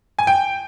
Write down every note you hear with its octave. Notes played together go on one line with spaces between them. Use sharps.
G#5
G5